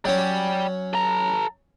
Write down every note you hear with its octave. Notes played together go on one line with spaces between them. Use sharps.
F#3 C#4 D5 G5
A4 A#5